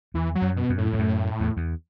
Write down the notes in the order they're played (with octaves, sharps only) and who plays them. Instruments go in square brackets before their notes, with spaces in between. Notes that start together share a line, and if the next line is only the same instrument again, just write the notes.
[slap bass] E2 [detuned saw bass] E3
[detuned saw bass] F#3
[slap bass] F#2
[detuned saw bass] B2
[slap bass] F#2
[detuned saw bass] A2
[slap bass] E2
F#2
E2
E2